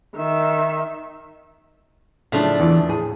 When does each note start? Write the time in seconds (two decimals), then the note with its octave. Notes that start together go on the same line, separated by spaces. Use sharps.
0.16 D#3 E5
2.32 A2 C#3 F3 F#3 A3 D4
2.60 E2 E3
2.88 A2 G#4